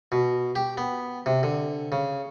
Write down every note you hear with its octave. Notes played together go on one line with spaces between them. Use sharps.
B2
G4
B3
C3
D3
C#3